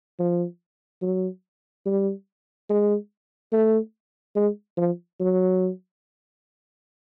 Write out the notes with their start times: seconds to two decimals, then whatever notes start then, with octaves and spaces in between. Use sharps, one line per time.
0.19 F3
1.02 F#3
1.86 G3
2.70 G#3
3.53 A3
4.36 G#3
4.77 F3
5.20 F#3